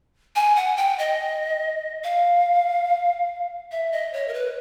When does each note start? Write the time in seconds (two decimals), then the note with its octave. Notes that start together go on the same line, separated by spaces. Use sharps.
0.35 G#5
0.56 F#5
0.77 G5
0.99 D#5
2.04 F5
3.71 E5
3.92 D#5
4.13 C#5
4.28 A#4
4.34 B4